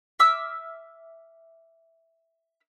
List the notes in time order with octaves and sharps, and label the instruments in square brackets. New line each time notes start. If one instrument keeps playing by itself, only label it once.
[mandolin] E5 D6 E6 F6